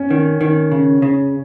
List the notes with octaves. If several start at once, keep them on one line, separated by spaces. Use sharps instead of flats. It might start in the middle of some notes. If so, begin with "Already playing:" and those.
Already playing: C#4
D#3
D#3
C#3
C#3